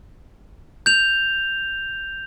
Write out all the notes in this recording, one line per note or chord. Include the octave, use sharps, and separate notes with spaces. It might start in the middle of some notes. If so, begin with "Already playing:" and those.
G6 F7